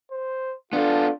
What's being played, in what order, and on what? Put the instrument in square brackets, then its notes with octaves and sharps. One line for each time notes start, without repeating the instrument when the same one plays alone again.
[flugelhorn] C5
[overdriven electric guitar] B3 A4 [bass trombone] D4 [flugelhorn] F4